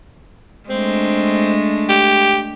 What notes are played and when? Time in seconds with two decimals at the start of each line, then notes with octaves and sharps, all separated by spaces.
0.69 G#3 A3 C4 D4
1.89 G4